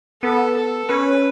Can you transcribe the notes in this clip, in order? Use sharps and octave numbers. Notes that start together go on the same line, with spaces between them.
B3 A4
A4
C#4 B4